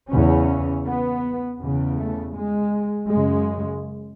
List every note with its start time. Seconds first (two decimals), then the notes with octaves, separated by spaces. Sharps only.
0.10 E2 C#3 C#4
0.85 B3
1.60 E2 C#3
1.98 A3
2.35 G#3
3.10 F#2 C#3 G#3